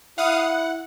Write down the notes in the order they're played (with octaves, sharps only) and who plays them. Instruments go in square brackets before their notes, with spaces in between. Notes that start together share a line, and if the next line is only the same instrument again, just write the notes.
[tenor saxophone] E4 [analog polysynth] F5 F#5 D#6
[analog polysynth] F#5